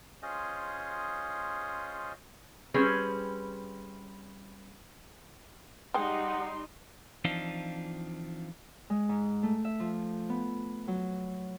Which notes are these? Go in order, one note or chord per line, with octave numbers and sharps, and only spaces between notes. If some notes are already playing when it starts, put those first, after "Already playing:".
C#4 F4 G#4 C5 D#5
G3 C4 C#4 G#4 B4
G3 G#3 D#4 F#5 G5 C6
E3 F3 C4 D4 D#4 F4
G#3
G#2
A3
E5
F3
B3
F#3